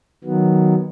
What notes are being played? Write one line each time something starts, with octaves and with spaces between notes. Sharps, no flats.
D#3 F#3 B3